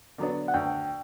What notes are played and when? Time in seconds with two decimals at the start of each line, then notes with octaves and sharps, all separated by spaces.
0.18 D3 F#3 B3 D4
0.48 F#5
0.54 D2 G5